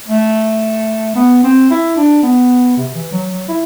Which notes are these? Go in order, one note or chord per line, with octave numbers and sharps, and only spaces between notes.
A3
B3
C4
E4
D4
B3
C3
E3
F#3
F#3
E4